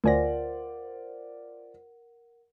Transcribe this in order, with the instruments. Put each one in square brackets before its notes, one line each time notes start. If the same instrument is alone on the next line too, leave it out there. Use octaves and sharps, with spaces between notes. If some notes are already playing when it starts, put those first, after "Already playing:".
[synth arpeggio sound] D2 G#5 A#6 [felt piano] F4 C5 D5 [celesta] A#4 F#5